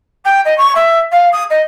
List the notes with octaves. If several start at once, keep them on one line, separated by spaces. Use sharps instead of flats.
G5
D#5
C#6
E5
F5
D#6
D#5